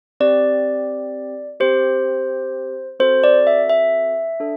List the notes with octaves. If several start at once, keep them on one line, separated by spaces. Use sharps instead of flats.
C4 G4 D5
C4 G4 C5
C4 F#4 A4 C5
D5
E5
E5
D4 A4